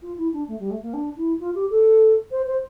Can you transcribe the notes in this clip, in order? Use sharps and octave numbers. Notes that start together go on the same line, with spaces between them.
F4
E4
D4
A3
G3
A3
A#3
D4
E4
F4
G4
A4
C5
C5